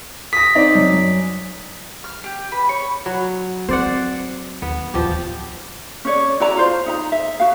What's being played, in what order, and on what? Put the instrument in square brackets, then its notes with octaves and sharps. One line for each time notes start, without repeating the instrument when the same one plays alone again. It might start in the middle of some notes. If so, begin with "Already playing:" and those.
[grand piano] D#6 A#6 [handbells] B6
[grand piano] C4 D#4 D5
F#2
[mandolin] F6
G4
B4
C#5
[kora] F#3
[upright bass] C4 [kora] C5 D5 F#5
[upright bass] D#2 [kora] B3
[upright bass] D1 E2 [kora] F3 G4
[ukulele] C#4 C#5 D5
E4 F#4 D5 A#5
F4 C5
D#4 E5 A#5
E5
F#4 F5